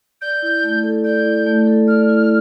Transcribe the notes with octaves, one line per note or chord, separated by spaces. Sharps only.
D5 G6
E4
A3
A4
D5 G6
E4
A3
A4
D5 F6
E4